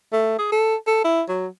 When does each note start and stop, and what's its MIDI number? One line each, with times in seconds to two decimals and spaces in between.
0.12 0.34 57
0.39 0.48 68
0.52 0.75 69
0.87 1.01 69
1.04 1.22 64
1.28 1.47 54